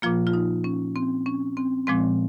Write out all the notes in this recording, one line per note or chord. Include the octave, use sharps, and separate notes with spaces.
A#2 F3 A#3 F4
F4
D#4
C#4
C4
C#4
C4
A#2 F3 G#3 C4